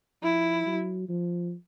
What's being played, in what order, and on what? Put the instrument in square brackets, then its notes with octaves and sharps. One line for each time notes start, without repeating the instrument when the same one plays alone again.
[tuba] F3 [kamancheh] E4
[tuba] F#3
F3